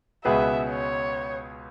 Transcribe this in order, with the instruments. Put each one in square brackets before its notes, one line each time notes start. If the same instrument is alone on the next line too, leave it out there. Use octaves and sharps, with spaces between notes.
[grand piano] C#2 B2 B3 G#4 B4 [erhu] E5
[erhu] C#5